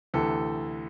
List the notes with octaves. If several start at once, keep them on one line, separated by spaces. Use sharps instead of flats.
D2 C3 E3 A4